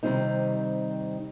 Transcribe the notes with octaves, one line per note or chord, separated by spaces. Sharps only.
C3 D#3 E3 G3 C4 D#4